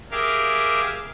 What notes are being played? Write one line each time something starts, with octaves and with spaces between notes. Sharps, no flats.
G4 G#4 A#4 E5 F5